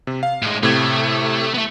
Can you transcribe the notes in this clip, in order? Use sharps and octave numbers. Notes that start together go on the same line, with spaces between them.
C3
F5
A2 G#3
A2 C3 A3 G#6
A3 B3